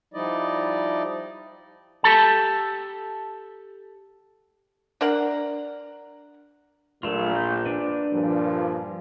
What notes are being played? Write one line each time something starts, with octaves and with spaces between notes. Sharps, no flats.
F3 G3 D#4 E4 D5 D#5
G4 A4 A5
D4 A#4 F#5
A#1 A#2 F#3 A3 F4
G6
D4 B4
G2 A#2 F3